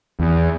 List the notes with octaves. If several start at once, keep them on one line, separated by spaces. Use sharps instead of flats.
E2